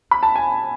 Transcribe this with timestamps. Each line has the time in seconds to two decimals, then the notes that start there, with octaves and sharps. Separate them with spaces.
0.11 B5
0.23 A5
0.36 G#5